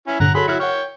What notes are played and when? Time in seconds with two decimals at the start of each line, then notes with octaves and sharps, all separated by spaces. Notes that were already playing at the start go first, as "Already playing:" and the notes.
0.08 C#4 E4
0.20 G2 A#2 D3 F#5 A#5
0.35 F#3 G#4 A4 B5 C6
0.48 F#3 E4 F6 C#7
0.60 C#5 F#5 G5 F6